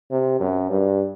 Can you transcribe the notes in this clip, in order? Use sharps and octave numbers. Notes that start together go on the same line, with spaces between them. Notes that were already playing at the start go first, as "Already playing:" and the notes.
C3
F#2
G2